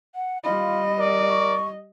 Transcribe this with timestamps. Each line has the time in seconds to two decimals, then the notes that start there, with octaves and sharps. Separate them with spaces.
0.15 F#5
0.44 G3 F4 D#5 B5
0.98 A#4 D5
1.29 C#6